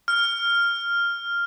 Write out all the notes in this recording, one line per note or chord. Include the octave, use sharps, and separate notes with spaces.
F6